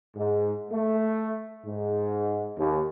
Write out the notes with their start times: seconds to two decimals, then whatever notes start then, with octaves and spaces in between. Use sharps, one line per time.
0.15 G#2
0.72 A3
1.65 G#2
2.57 D#2